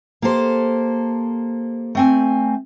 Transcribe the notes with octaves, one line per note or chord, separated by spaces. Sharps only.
A#3 G4 A4 C5
A3 C4 G#5